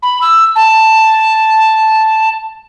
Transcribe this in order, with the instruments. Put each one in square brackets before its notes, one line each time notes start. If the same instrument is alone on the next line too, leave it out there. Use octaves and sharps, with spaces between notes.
[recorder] B5
E6
A5